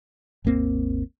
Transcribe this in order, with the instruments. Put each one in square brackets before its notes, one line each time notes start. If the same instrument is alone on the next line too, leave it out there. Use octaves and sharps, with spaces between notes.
[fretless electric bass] G#1 D#2 A#3 C4